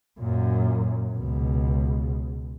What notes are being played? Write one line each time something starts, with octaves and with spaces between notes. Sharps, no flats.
F#2 A#2
C#2 B2